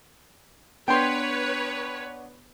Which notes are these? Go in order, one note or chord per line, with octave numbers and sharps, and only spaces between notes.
B3 D4 B4 C#5 G5 C6